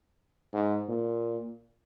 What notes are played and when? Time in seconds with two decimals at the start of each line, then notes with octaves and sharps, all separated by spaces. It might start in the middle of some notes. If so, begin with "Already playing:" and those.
0.53 G#2
0.88 A#2